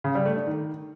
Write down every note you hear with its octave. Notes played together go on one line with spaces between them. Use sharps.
C#3
G3
A3
D4
D#3